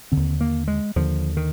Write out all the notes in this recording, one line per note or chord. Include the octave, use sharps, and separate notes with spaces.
D#2 D3 C4
A#3
G#3
D#2 D3 F3
D#3